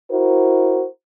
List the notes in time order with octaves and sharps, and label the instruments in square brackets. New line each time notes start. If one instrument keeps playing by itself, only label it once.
[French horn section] E4 F#4 A#4 C5